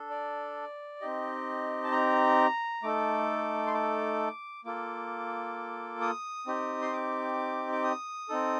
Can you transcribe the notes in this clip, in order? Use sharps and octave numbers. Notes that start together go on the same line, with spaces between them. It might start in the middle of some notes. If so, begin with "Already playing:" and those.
Already playing: D4 A4
D5
C4 D#4 G4 D#5
A5
A#5
A3 D#4 A4 D6
C6
D6
A#3 F4 A4 D6
D#6
C4 D#4 G4
C6
D6
D6
D#6
C4 D#4 A4